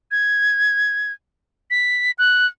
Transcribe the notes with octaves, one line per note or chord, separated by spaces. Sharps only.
G#6
B6
F#6